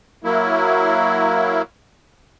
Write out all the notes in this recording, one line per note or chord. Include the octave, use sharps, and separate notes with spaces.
F#3 A#3 E4